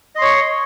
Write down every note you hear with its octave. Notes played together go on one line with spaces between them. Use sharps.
C#5 D#5 C6 C#6